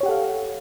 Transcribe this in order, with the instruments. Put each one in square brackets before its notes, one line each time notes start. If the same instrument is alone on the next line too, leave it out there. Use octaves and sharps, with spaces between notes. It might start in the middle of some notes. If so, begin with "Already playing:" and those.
[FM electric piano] C#5
G4
F#5
A4
F5